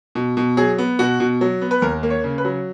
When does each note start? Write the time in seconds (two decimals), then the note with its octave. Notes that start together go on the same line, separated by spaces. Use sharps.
0.15 B2
0.37 B2
0.57 F#3 G#4
0.78 B3
0.99 B2 F#4
1.20 B2
1.41 F#3
1.61 B3
1.71 B4
1.82 D#2 A#4
2.03 A#3
2.10 C#5
2.24 C#3
2.38 B4
2.44 F#3